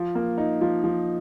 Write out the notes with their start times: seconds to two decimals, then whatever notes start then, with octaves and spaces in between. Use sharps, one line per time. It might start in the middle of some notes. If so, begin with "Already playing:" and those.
Already playing: F3
0.15 A#3
0.38 D#4
0.61 F3
0.84 F3